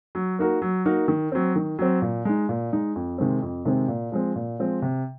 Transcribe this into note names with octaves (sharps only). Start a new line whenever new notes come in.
F#3
A#3 D#4 F#4 A#4
F#3
A#3 D#4 F#4 A#4
D#3
F#3 C4
D#3
F#3 C4
A#2
G#3 D#4
A#2
G#3 D#4
F2
C3 D#3 G#3 C4
F2
C3 D#3 G#3 C4
A#2
F3 G#3 C4
A#2
F3 G#3 C4
C3